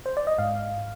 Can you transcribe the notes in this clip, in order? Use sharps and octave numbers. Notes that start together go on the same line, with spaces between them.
C5
D5
D#5
G#2 F5